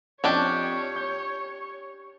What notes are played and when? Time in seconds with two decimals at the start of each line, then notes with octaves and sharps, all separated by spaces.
0.24 F2 C#4 D4 G4 C#5 D#5 G5
0.96 G6